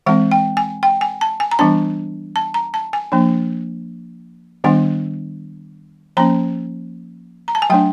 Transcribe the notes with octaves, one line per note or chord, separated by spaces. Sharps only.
E3 G#3 C4 F#5
G5
G#5
G5
G#5
A5
G#5
A#5
E3 G3 B3 D4 A5
A5
A#5
A5
G#5
F3 A#3 D4
D#3 G3 B3 D4 F#5
F3 A#3 C#4 A#5
A#5
A5
G#5
F#3 A3 D4 G5